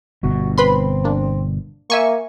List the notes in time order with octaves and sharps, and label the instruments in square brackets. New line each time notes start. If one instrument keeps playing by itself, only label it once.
[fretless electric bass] G1 B2 [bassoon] F#4
[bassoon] C4 [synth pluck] B4 B5 C6
[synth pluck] A#3 D4
[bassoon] A#3 [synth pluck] E5 G#5 C#6